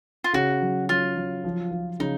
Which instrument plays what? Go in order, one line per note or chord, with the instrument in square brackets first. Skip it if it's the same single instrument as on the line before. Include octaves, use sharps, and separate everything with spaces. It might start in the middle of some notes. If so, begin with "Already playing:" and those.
[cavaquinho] F4
[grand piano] C#3 [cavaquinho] F#4
[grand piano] F#3
[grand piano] F#3 [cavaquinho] F4
[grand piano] F#3
F3
F3
[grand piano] C#3 [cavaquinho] D#4